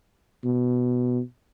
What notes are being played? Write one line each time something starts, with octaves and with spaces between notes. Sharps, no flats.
B2